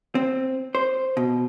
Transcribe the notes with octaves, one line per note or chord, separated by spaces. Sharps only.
C4
C5
B2